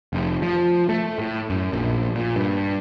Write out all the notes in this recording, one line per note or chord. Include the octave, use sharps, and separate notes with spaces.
F1
F3
A3
A2
F#2
A#1
A#2
G2